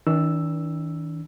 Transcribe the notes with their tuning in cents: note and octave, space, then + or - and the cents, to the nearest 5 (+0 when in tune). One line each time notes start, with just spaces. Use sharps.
D#3 +45 D4 -30 E6 +0